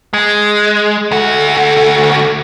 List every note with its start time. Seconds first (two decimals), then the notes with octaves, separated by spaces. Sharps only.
0.14 G#3
1.11 D2 F#4 A4